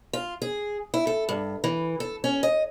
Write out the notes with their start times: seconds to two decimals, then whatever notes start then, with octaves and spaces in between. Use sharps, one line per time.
0.13 F4
0.42 G#4
0.94 E4
1.07 A4
1.29 G2
1.64 E3
2.00 A4
2.24 C#4
2.43 D#5